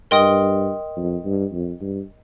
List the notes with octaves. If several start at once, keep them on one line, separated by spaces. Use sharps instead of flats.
G2 A#4 D#5 G5 C6 D#6
F2
G2
F2
G2